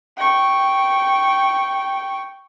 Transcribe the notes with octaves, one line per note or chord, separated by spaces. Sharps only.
G5 C#6